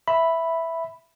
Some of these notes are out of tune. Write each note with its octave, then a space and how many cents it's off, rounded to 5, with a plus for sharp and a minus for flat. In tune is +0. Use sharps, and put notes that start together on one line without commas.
E5 +0 B5 +0